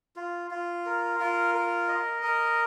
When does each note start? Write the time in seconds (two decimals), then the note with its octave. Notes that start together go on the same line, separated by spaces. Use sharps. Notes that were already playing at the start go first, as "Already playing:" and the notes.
0.16 F4
0.51 F4
0.86 A#4
1.20 F4
1.55 A#4
1.88 D#5
2.23 A#4